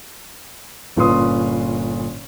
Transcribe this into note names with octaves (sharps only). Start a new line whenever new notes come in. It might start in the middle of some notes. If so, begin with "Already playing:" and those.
G1 A#2 C#4 B4 C6 D#6